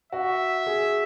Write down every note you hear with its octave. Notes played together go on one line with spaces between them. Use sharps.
F#4 E5
G#4